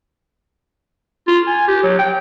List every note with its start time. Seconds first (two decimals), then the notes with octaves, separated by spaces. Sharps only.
1.27 F4
1.47 G#5
1.68 G4
1.83 F#3
1.99 G5